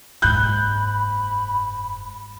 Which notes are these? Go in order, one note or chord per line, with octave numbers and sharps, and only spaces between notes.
F#1 G#2 B5 F#6 G6